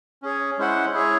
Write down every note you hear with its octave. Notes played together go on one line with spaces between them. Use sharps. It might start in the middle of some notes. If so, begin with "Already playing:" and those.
C#4 G#4 C#5
G#3 C#4 E4 C5 F#5
E4 G#4 C#5